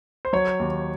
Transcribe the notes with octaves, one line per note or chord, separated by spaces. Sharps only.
C5
F#3 C#5
D#2